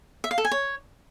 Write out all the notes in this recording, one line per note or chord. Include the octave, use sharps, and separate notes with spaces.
E5
F5
A4
G#5
C#5